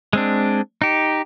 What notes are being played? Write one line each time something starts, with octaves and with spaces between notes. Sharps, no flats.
G#3 C4 D4
D#4 G4